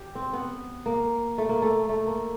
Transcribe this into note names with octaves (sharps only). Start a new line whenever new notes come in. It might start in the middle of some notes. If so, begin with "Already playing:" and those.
Already playing: G4
C4
B3
A#3
A3
A#3
A3
A3
A#3